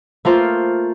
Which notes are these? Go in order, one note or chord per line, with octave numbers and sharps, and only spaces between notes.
A3 A#3 F4 C5